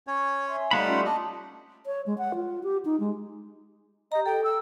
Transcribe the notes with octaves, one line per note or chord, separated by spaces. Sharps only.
C#4 C#5
E5 G#5 C6
G3 A3 D#4 F5 F#5 B5
C#4 F4 C6
D4 D#5 A5 D6
C#5
G#3
F#5
F4
G4
D#4
G#3
G4 D#5 A#5
A4 G5
E6